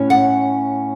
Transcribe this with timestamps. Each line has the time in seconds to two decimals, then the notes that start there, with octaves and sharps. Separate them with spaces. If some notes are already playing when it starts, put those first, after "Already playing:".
Already playing: A2 C#4
0.10 F#5